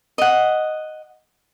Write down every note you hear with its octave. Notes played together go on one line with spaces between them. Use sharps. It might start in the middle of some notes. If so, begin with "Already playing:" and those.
D#5 F#5